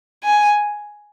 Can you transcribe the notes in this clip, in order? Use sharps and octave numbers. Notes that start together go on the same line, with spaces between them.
G#5